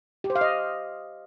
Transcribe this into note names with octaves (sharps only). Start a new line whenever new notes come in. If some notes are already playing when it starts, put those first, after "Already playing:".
G4
C5
F5
D#5